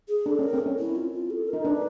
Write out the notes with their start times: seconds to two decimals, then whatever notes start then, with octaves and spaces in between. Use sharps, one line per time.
0.08 G#4
0.26 D4 A4
0.39 C#4 A#4
0.54 C4
0.66 C#4
0.78 E4
0.96 F4
1.13 F4
1.30 A4
1.48 A#4
1.53 D#4
1.65 D4 B4